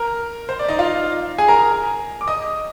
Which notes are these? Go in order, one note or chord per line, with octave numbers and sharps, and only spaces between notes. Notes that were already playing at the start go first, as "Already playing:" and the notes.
Already playing: A#4 A#5
C5
D5
D#4 D#5
F4 F5
G#4 G#5
A#4 A#5
D6
D#5 D#6